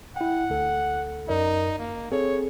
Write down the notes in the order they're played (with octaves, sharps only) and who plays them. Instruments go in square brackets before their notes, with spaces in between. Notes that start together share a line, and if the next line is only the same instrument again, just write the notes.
[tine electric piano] E4 G5 [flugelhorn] F#5
[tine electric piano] D2 A4
[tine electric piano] F#2 A#4 D5 [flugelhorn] D#4
[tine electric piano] G1 [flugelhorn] A#3
[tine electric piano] C4 G#4 A4 [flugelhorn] C#5